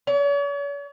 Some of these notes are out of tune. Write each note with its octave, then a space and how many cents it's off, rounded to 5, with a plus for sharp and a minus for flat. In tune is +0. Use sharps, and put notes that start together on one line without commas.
C#5 +45